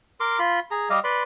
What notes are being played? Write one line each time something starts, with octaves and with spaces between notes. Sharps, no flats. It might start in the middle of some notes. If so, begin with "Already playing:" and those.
A#4 C6 D6
F4 B5 C6
G#4 A#5
G3 G4 D#5 F5
B4 D5 B5 C6